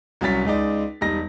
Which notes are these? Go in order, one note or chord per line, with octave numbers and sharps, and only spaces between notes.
C2 F#3 C#4 A6 B6
C#2 G#3 D#4 D5
E1 G3 D#4 A#6